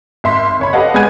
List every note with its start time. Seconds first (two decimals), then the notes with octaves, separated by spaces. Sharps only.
0.24 G#1 E5 C6 B6
0.59 F#1 C#5 B5
0.73 G4 A4 B4 D#5 F5 F#5
0.94 G#3 B3 B4 G#5 G#6 D#7